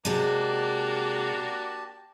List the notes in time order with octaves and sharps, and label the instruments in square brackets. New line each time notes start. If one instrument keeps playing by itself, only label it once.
[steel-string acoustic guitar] C3 G#3 [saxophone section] A#3 D4 F#4 [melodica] G4 A5